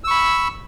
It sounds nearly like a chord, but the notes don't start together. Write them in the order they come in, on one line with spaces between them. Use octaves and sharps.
E6 C#6 B5